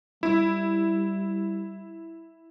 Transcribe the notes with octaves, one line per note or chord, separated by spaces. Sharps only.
G3 E4